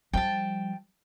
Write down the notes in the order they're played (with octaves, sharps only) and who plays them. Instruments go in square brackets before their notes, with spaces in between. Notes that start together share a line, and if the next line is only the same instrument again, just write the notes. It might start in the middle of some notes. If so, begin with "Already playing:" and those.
[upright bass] F3 G3 [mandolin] G5 A5